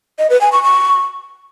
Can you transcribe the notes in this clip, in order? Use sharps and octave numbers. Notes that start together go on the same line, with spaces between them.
D#5
B4
G#5
C#6
C#6